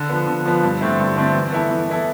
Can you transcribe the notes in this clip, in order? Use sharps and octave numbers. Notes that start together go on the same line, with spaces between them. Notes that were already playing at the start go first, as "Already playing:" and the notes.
Already playing: D3
F3 B3
D3
F3 B3
G2
D3 A3 C4 E4
G2
D3 A3 C4 E4
E3
B3 E4 A4
E3
B3 E4 A4